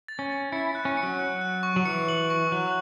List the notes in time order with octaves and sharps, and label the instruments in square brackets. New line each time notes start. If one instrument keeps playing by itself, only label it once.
[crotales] A6
[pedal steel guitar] C#4
[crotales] A6
[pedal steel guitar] E4 [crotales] C#7
[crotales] F#6
[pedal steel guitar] C#4
[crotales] C#7
[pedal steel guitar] F#3
[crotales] F#6
F#6
C#6
[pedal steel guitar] F#3
[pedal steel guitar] E3 [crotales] C#7
[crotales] F#7
C#6
[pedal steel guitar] F#3 [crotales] F#6